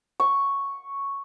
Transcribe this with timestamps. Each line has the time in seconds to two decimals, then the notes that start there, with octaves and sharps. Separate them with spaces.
0.20 C#6